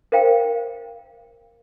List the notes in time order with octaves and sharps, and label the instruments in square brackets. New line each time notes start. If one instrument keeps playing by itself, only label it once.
[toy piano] A#4 C5 F5 G5